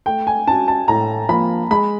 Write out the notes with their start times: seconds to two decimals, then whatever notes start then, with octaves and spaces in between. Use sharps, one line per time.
0.06 A3 G5
0.27 G#5
0.47 C#4 F#4 A5
0.68 A5
0.88 A2 A#5
1.29 F3 A#3 B5
1.71 G#3 B5